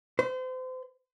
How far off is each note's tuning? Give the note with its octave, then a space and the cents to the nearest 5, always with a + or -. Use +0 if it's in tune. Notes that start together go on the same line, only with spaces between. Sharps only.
C5 -35